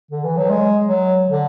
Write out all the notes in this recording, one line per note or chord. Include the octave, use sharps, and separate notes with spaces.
D3
E3
F#3
G#3
F#3
D3